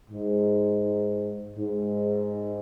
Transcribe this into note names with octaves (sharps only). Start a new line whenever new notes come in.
G#2
G#2